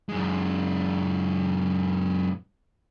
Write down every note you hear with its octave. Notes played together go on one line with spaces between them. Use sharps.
F#2 G#3